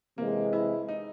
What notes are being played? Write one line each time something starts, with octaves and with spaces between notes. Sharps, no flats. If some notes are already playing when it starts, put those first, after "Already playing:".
C3 E3 G#3 A#3
E4
D#4